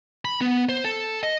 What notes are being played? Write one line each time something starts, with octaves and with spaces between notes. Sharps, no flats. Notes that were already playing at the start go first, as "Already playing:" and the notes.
B5
B3
C5
A4
D#5